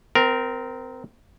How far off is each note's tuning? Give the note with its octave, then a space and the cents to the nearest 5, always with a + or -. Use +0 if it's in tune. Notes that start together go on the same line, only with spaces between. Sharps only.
C4 -25 A#4 +0